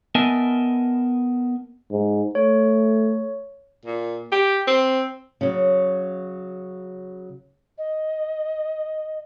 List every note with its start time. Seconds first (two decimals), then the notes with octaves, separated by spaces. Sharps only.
0.15 B3 A#4 D#5 E5 G#5 A5
1.91 G#2
2.35 A3 C#5
3.85 A#2
4.32 G4
4.68 C4
5.41 C#3 F#3
7.78 D#5